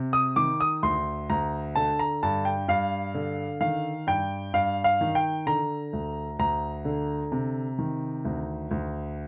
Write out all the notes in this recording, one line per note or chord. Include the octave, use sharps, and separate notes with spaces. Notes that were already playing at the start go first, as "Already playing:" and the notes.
Already playing: C3
D#6
D#3 D6
D#6
D2 C6
D2 A#5
D3 A5
A#5
G2 A5
G5
G2 F5
D3
D#3 F5
G2 G5
G2 F5
F5
D#3
G5
D3 A#5
D2
D2 A#5
D3
C3
D#3
D2
D2